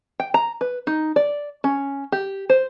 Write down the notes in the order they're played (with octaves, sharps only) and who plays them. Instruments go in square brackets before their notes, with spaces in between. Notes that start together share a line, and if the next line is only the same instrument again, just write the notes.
[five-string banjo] G5
A#5
B4
D#4
D5
C#4
G4
C5